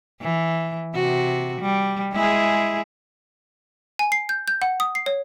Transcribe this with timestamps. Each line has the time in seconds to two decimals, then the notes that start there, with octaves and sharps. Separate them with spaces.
0.21 E3
0.95 C3 F#4
1.61 G3
2.13 G#3 E4 G#4
3.99 G#5
4.12 C7
4.29 G6
4.48 G6
4.62 F#5
4.80 D#6
4.95 C7
5.06 C#5